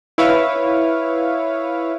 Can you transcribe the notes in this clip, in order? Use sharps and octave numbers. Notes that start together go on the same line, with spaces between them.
E4 B4 C#5 F5